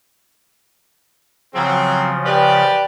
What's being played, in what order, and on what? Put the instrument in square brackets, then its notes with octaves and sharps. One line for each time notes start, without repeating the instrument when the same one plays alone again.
[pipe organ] C#3 F3 [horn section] F#3 C4
[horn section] G4 B4 D5